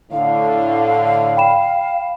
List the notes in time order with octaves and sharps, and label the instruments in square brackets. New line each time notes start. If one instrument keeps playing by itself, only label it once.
[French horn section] A2 D3 [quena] F5
[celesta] G5 B5 E7